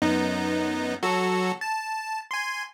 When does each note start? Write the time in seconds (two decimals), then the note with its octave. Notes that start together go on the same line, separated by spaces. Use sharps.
0.02 F#2 B3 D#4
1.03 F#3 F#4 A4
1.61 A5
2.31 G#5 C6